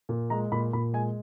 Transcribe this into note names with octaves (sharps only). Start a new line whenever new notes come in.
A#2
G#3 A#5
A#2 B5
A#2 B5
G#3 G#5